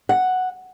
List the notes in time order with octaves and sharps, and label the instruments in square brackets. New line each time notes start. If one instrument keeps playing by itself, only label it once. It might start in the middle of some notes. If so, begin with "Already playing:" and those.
[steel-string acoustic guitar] F#5